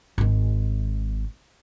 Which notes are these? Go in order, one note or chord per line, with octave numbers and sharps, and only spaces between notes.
G#1 G#3